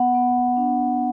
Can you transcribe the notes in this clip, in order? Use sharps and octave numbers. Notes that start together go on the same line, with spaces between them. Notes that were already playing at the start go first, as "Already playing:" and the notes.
Already playing: B3 F#5
B3
D4